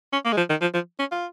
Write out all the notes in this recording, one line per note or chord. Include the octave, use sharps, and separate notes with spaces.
C#4
A#3
G#3
F3
D#3
F3
F3
C#4
F4